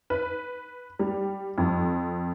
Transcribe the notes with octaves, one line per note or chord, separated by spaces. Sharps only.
B4
G3
F2